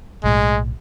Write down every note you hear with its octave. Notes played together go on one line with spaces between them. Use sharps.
B1 A2 G#3